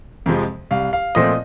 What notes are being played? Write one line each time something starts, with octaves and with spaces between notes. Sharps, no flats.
F2 C3 F3 G#3
C2 F5
F5
A#2 F3 A3 C4 D#5